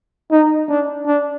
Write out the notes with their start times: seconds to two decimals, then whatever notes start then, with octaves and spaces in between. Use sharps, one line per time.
0.31 D#4
0.69 D4
1.07 D4